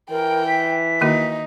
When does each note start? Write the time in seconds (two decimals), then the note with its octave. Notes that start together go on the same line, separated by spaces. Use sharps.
0.11 E3 A#4 G5
0.48 B6
1.01 D#3 A#3 D#4 F#4